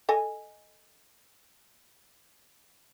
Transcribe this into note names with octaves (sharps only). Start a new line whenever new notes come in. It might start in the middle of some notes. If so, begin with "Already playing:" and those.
A4 D#5 G#5